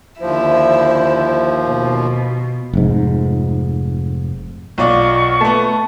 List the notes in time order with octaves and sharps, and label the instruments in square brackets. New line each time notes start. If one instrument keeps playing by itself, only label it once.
[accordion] D#2 F3 [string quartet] D3 E4 E5 [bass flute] C5
[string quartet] B2
[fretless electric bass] F1 G#2
[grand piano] B1 F4 D5 [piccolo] C#6
[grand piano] A3 B3 [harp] A5